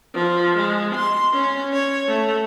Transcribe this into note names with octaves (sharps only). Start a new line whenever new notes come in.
F3
G#3
C6
C#4
C#5
A3